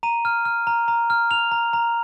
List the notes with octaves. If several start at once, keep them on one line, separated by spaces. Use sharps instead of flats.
A#5 D#7
F6
F6
A#5
A#5
F6
F6 F7
A#5
A#5